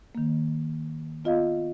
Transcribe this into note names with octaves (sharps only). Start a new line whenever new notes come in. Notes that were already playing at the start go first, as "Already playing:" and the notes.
D#3 A#3
B3 F4 D#5 F5